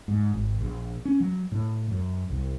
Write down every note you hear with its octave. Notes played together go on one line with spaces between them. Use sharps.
G#2
G#1
A#1
C#4
F#3
A2
F#2
C2